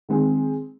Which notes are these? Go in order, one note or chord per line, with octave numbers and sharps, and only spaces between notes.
D#3 G#3 C4 G#4